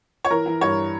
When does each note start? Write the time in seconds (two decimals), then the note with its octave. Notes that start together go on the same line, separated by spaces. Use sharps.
0.25 C#5
0.30 E3 A#4
0.46 E3
0.61 G2 C#5